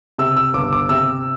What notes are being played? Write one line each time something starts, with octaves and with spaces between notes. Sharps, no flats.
C3 E6
E6
G1 D6
D6
C3 E6